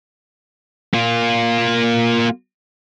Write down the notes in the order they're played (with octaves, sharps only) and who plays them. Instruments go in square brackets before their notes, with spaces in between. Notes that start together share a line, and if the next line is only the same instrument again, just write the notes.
[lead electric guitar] A#3 F4